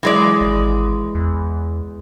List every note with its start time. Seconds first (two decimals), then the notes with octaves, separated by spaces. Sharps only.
0.03 E3 F#3 G#3 D5
0.41 G#1
1.15 E2